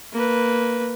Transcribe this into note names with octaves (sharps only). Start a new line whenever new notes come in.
A#3 B4